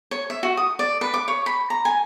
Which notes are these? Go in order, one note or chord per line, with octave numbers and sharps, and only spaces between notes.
C#5
E5
F#4
D#6
D5
B4
D6
C#5
B5
A#5
G#5